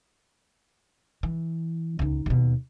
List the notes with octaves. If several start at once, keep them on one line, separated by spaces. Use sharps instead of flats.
E3
C#2 D#4
D#2 B2